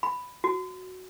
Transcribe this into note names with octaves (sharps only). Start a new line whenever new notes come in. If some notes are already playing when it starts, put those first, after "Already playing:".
B5
F#4